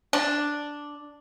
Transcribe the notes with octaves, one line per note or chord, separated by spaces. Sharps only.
D4